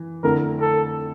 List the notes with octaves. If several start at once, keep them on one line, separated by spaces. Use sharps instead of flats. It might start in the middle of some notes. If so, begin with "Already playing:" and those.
Already playing: E3
F2 D3 A3 E4 A#4
A4